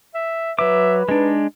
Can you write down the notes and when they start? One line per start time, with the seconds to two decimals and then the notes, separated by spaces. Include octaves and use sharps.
0.15 E5
0.59 F#3 B4 E5 D6
1.09 G#3 D4 D#4